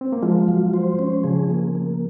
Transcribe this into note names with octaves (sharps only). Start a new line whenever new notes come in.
C4
A#3
F3 G#3 F4
F#3
C5
C#4
C#3 F3 G#4
A#3
A#3